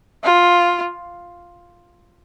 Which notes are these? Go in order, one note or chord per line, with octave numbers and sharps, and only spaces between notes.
F4